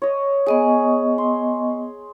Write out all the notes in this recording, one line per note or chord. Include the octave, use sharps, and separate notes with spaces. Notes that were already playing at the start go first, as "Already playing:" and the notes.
C#5 D#5
B3 G#4 D#5 C#6
C6